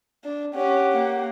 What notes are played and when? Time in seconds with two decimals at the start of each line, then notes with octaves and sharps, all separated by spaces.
0.24 D4
0.54 C#4 G4 F#5
0.93 A#3